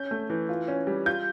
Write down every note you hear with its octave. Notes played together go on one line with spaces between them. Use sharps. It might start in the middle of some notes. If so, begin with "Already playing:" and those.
Already playing: C#4 G6
A3
E3
F4
C#4
G3
F4 G6